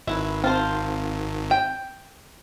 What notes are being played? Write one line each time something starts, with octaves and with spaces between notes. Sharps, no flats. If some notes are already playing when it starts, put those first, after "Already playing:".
G#1 E4 B4
C4 F4 C5 A5
G5